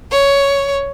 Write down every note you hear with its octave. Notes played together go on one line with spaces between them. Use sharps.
C#5